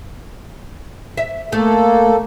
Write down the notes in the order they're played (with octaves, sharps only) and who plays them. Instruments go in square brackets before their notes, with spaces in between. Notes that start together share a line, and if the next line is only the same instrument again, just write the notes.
[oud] E5
[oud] A3 [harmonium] A#3 A4